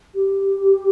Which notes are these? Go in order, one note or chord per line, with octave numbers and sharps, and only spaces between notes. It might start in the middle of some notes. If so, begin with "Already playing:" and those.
G4